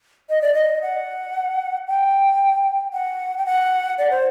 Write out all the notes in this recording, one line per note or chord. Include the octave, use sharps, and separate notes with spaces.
D#5
D5
D#5
F#5
G5
F#5
G5
F#5
D5
C5